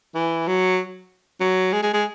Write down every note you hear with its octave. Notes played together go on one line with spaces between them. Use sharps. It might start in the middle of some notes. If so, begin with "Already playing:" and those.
E3
F#3
F#3
G#3
G#3
G#3